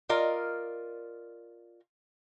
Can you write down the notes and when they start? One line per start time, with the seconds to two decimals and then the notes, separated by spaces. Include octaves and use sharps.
0.09 F4 A#4 D5 D#5